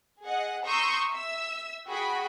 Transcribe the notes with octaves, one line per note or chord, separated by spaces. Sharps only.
G#4 D#5 F#5
A#5 C6 C#6 D#6 E6 G6
E5 E6
F#4 G#4 G5 B5